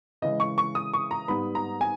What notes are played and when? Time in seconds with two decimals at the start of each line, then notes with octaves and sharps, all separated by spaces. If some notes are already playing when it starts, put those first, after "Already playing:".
0.22 C#3 E3 G#3 D#5
0.40 C#6
0.58 C#6
0.75 D#6
0.93 C#6
1.11 A#5
1.28 G#2 G3 B3 B5
1.55 A#5
1.81 G#5